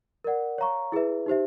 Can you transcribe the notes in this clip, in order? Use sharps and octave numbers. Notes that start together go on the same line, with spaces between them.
A#4 D5 F#5
C#5 F5 A#5 C#6
E4 G#4 B4 E5
D#4 G4 C5 E5